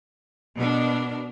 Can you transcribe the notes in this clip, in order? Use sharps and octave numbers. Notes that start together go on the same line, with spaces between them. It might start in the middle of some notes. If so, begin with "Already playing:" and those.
B2 D4 A#4